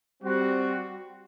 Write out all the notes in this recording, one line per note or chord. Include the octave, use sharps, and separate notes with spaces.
G3 C4 F#4